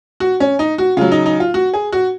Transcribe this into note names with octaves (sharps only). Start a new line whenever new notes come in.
F#4
C#4
D#4
F#4
C#3 F#3 F4
D#4
D#4
F4
F#4
G#4
F#4